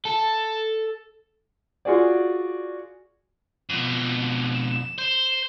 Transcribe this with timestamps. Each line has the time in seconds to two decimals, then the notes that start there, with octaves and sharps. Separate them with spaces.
0.05 A4
1.85 F4 F#4 G#4 D5
3.69 F2 B2
4.54 E7
4.98 C5